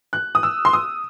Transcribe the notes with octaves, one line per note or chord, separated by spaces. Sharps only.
F#6
D#6
E6
C6
D#6